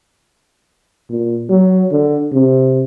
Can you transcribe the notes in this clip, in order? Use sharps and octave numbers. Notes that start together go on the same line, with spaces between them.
A#2
F#3
D3
C3